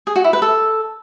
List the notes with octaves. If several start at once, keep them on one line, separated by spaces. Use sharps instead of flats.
G#4
F#4
E4
B4
A4